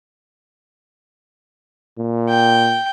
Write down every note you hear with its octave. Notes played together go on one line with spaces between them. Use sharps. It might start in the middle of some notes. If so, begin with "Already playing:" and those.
A#2
G5